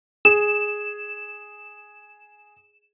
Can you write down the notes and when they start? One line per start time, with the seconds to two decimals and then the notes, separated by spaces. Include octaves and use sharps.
0.25 G#4 E7